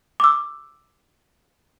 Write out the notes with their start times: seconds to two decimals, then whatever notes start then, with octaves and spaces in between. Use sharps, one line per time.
0.20 D6 E6